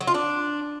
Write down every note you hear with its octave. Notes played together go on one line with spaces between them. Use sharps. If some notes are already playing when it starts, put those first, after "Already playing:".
F#3
F4
D4